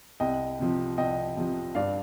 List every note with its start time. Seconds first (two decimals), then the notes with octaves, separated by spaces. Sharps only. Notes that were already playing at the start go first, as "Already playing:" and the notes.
0.20 C2 D#5 G5
0.59 C3 F3
0.98 C2 D#5 G5
1.37 C3 F3
1.75 G2 D5 F5